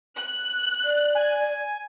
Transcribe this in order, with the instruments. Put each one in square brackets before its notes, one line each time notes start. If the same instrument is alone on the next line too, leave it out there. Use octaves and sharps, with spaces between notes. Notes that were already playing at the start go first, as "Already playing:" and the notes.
[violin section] F#6
[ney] D5
[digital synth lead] G#5